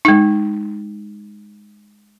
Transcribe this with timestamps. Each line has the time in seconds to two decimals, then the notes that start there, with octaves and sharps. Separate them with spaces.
0.05 G#3 D#4